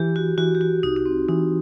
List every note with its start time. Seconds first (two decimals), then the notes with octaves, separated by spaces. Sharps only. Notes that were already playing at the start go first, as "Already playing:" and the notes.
Already playing: E3 G4
0.16 F#4
0.37 E3 F#4
0.55 G4
0.61 F#4
0.83 C2 D#4
0.96 D#4
1.06 C4
1.28 E3 D#4